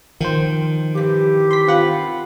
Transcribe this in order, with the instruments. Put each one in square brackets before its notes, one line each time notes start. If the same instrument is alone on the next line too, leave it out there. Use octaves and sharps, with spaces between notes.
[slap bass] D#3 [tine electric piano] F3 C5 [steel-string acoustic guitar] G5
[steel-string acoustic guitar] G2 E3 [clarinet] G4
[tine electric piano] C6 B6
[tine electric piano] C4 F#5 B5 [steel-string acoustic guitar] F4